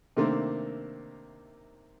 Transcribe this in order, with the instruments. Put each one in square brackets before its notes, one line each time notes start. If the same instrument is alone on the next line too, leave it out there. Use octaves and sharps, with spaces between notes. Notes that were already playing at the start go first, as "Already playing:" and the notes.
[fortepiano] C3 D#3 A3 A#3 C4 D4